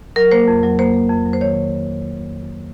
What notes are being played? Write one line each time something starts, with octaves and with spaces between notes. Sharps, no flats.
F#3 A#4
A#3 C5
F2
F#3
A#3 C5
A#3
F2
F#3
C5
D#3 C#5